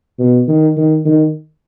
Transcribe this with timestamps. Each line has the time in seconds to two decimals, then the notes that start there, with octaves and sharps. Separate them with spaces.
0.19 B2
0.48 D#3
0.77 D#3
1.05 D#3